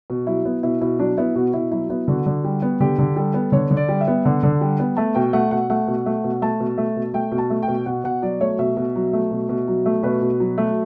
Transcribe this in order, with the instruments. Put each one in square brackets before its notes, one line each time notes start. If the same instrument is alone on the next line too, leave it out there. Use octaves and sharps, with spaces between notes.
[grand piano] B2
F#3 E4
B3
B2 E4
B2 E4
F#3 D4
B3 E4
B2 F#4
B2 E4
F#3 E4
B3 E4
D3 F#4
D3
G3
B3
D3 G4
D3
G3 A4
B3
D3 C#5
D3
D5
G3
E5
B3
D3 F#5
D3
G3
B3
A3 A5
B2 G5
A3 F#5
B2 F#5
A3 F#5
B2
A3
B2
A3 A5
B2
A3
B2
A3 G5
B2
A5
A3
G5
B2
B2 F#5
B2 F#5
F#3 D5
A3 C#5
B2 E5
B2
F#3
A3
B2
B2
F#3
A3
B2 B4
B2
F#3
A3